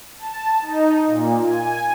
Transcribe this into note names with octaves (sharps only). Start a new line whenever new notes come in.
A5
D#4
A#2
G#5